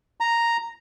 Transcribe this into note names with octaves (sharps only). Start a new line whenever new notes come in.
A#5